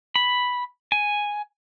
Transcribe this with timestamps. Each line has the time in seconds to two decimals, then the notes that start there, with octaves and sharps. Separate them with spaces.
0.16 B5
0.92 G#5